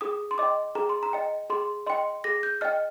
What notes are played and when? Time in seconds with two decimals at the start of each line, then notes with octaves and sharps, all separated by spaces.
0.01 G#4 D#6
0.31 C6
0.38 D#5 G5 D6
0.75 G#4 A#5
0.89 C6
1.03 A#5
1.13 D#5 G5
1.50 G#4 C6
1.87 D#5 G5 C6
2.24 G#4 A#6
2.43 G6
2.61 D#5 G5 F6